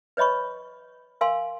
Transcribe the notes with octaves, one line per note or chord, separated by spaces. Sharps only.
B4 C#5 D#5 B5 C#6
A#4 F5 G#5 C6